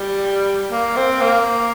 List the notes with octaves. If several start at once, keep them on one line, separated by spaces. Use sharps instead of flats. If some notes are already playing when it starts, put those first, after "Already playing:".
Already playing: G3
A#3
C4
A#3